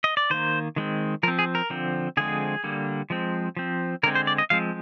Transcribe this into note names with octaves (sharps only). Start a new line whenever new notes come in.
D#5
D5
D#3 A#3 C5
D#3 G#3 C4
F3 C4 A#4
G#4
A#4
D3 F3 C4
D3 F3 G#3 C4 G#4
D3 G3 A#3
F3 G#3 C4
F3 C4
D3 G#3 C4 A#4
C5
D5
D#5
F3 G#3 C4 F5